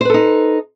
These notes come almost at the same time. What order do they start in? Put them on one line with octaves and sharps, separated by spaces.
C5 B4 A4 D#4